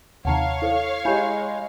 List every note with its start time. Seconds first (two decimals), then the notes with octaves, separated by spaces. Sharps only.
0.25 D#2 C3 D#3 C#5 F5 F#5 A5 A#5
0.62 E4 A4 C5
1.05 G#3 E4 G4 G#5 B5 G6